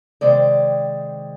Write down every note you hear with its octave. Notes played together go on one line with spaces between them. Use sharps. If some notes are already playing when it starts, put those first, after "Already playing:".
C3 D#3 G#3 C4 D5